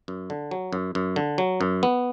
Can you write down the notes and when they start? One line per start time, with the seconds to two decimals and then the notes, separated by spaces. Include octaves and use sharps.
0.08 F#2
0.30 D3
0.51 F#3
0.73 F#2
0.95 F#2
1.16 D3
1.38 F#3
1.61 F#2
1.83 B3